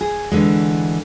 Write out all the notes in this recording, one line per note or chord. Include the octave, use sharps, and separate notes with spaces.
G#4
D3 E3 G#3